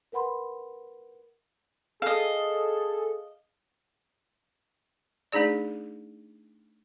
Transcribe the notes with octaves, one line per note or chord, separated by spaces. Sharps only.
A#4 B4 F#5 B5 C6
G#4 A4 D#5 F5
A3 D4 D#4 G#4 D5